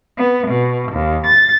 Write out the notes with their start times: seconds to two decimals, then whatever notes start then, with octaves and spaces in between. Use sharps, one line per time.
0.17 B3
0.47 B2
0.91 D#2
1.25 A6